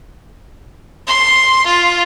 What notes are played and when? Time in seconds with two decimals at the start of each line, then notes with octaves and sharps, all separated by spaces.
1.08 C6
1.67 F4